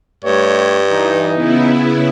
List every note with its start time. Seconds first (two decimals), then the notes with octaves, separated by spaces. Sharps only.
0.24 G2 G3 A3 C#5
0.90 E3 D#4
1.33 C#3 B3 E4